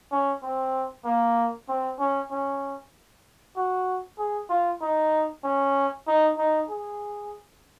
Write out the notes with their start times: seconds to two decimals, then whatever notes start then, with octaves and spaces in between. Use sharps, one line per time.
0.12 C#4
0.43 C4
1.05 A#3
1.69 C4
1.99 C#4
2.31 C#4
3.56 F#4
4.18 G#4
4.50 F4
4.81 D#4
5.44 C#4
6.08 D#4
6.38 D#4
6.69 G#4